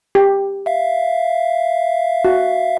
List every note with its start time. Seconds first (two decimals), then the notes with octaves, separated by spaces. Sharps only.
0.15 G4
0.66 E5 F5
2.25 F#4